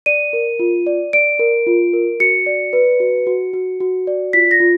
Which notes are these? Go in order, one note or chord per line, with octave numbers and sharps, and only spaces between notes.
D5 D#7
A#4
F4
D5
D5 D7
A#4
F4
A#4
F#4 C#7
D5
B4
F#4
F#4
F#4
F#4
D5
F4 B6
A#6
F4